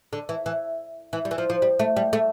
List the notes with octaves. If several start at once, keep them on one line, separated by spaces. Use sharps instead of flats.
D3
E3
E3
E3
G3
E3
F3
F3
G3
A3
G3
A3